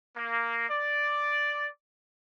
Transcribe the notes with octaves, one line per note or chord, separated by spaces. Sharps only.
A#3
D5